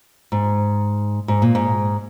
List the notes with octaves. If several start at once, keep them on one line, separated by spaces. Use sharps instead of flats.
G#2
G#2
A#2
G#2